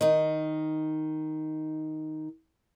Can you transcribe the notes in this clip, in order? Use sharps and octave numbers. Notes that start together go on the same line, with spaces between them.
D#3 D#4 D#5